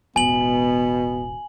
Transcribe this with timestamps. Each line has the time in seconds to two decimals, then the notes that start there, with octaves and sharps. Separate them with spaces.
0.16 E1 A1 B2 B3 G#5 F#7